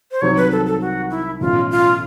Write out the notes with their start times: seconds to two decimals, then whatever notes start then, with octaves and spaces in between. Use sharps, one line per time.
0.11 C5
0.21 C2 C3 D#3 F#3 C#5
0.37 B4
0.51 A4
0.66 A4
0.81 F#4
1.10 E4
1.41 B1 A2 E3 A3 C#4 F4
1.71 F4